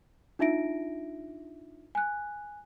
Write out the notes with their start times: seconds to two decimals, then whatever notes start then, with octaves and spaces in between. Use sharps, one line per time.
0.39 D4 D#4 F4 E5 A#6 D7
1.95 G#5 F#6